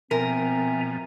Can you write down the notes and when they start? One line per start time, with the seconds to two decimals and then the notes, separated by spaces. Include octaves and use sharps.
0.11 B2 F3 C4 A#4 E5 G#5 A#5